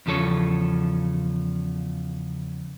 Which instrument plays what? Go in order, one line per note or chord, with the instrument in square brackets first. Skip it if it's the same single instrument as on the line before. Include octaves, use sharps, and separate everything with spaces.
[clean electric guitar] E2 C#3 F3 A4 C#5